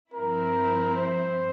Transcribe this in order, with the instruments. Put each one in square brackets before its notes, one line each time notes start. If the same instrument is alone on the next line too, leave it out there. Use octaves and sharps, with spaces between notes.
[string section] G2 F3 C4 E4 [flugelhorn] A#4
[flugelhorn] C5